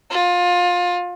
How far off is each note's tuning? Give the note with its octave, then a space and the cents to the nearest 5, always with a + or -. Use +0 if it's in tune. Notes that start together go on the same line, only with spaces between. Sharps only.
F4 +25